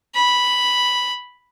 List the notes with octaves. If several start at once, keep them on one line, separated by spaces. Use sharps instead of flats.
B5